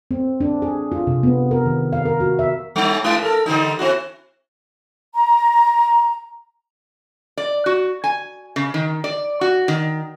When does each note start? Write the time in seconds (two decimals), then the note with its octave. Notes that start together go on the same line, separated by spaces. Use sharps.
0.11 C4
0.40 D4
0.62 G#4
0.92 F4
1.07 C3
1.23 B3
1.51 A#4
1.66 D#3
1.93 F5
2.05 A#4
2.20 F#4
2.39 E5
2.76 G3 D#4 E4
3.04 G2 G#3 E4
3.22 A4 A#4
3.46 D3 G3 D#4
3.79 C4 E4 F#4
5.15 A#5
7.37 D5
7.66 F#4
8.04 G#5
8.56 C#3
8.74 D#3
9.04 D5
9.41 F#4
9.68 D#3